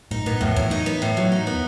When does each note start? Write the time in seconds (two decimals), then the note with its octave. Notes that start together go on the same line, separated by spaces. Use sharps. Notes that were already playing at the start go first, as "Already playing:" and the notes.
0.11 A2 D#4
0.26 A2 B3
0.41 F2 A2
0.56 E2 F#3
0.71 D#4
0.86 B3
1.02 A2
1.17 F#3
1.32 D#4
1.47 B3